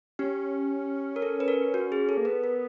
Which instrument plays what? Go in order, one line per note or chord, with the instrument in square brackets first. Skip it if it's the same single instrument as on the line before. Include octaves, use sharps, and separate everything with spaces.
[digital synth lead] C#4 [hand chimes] G4
[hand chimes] A#4
A4
B4
A#4
F#4
G#4
A4
[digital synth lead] A#3
[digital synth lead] B3 [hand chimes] B4
[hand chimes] A#4